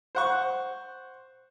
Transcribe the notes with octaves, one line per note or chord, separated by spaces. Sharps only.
C5 F#5 C#6